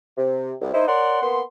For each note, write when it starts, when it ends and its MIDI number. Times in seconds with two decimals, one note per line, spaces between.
0.17 0.53 48
0.61 0.72 36
0.74 0.87 63
0.74 0.87 64
0.74 0.87 72
0.88 1.22 70
0.88 1.22 73
0.88 1.22 74
0.88 1.22 78
0.88 1.22 84
1.22 1.41 58
1.22 1.41 59
1.22 1.41 84